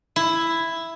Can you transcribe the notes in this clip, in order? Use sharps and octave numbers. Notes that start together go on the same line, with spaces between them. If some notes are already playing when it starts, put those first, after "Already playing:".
E4